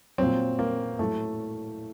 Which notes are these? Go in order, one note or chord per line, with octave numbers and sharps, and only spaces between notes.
A#2 F#3 C4
A#3
A2 F#3 A3